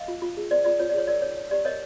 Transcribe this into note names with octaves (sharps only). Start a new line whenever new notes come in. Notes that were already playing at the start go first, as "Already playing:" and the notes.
Already playing: D#5 F5
F4
F4
G#4
C5 D5
F4 D5
F4 C#5
D5
G#4 C#5
A#4 D5
D#4 C#5
C#5
G4 D5
A#4 C#5 D#5